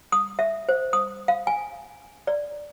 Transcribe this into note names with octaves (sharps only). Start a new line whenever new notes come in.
D#6
E5
C5
D#6
F5
G#5
D5